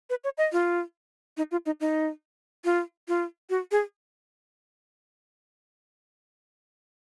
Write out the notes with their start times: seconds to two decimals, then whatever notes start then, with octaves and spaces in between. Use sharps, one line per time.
0.10 B4
0.24 C#5
0.38 D#5
0.53 F4
1.37 D#4
1.51 F4
1.66 D#4
1.80 D#4
2.65 F4
3.08 F4
3.50 F#4
3.72 G#4